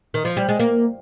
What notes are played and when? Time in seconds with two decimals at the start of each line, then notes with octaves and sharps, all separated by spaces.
0.14 D#3
0.25 F3
0.37 G3
0.49 G#3
0.59 A#3